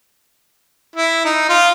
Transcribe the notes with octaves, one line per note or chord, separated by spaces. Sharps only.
E4
D#4
F4